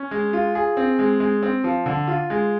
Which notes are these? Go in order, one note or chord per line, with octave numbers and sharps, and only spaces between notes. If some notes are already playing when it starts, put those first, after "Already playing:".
Already playing: C#4
G#3
F4
G#4
C4
G#3
G#3
C4
F3
D3
F4
G#3